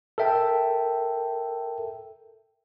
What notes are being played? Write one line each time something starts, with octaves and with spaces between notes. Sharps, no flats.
A4 A#4 E5 G5